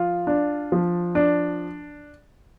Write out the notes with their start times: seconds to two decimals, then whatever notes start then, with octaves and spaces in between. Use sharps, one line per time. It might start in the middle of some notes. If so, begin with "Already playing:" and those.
Already playing: F3 F4
0.27 D4
0.72 F3
1.15 D4